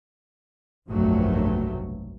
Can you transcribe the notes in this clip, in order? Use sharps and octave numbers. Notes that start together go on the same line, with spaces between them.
F1 A#1 G2 B2 F#3 A3